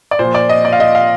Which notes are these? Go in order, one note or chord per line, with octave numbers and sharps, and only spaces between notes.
D5
A#2 F3 C5
D5
D#5
D5
F5
D#5
F5